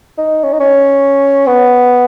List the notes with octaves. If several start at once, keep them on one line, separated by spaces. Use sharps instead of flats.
D#4
C#4
D#4
C#4
B3